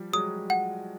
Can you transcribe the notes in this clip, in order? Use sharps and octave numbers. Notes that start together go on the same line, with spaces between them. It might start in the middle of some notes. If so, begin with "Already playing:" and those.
Already playing: F3 G3
F#3 G#3 D#6
F#5